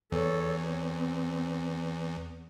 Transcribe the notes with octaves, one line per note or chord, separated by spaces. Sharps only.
E2 A4 C#5
C4